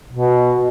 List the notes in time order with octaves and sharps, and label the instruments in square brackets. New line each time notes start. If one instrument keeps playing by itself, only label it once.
[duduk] B2